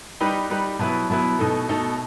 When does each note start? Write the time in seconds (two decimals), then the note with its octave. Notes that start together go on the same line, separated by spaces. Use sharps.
0.20 G3 D#4 G4 B4
0.50 G3 D#4 G4 B4
0.79 B2 F#3 B3 E4 B4
1.10 B2 F#3 B3 E4 B4
1.39 B2 A3 D#4 A4
1.69 B2 A3 D#4 A4